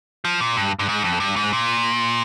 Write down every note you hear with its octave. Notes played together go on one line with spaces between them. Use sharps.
F3
A#2
G2
G2
G#2
F2
G2
G#2
A#2